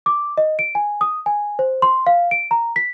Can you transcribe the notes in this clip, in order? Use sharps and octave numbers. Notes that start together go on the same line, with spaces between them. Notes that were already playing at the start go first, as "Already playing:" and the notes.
D6
D#5
D7
G#5
D#6
G#5
C5
C6
F5
D7
A#5
B6